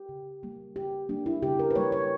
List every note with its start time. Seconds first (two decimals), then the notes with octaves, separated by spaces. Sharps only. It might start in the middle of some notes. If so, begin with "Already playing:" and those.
Already playing: G4
0.09 C#3
0.43 G3 A#3
0.76 C#3 G4
1.09 G3 A#3 D4
1.26 E4
1.43 C#3 G4
1.59 A#4
1.71 B4
1.75 G3 A#3 C#5
1.92 C#5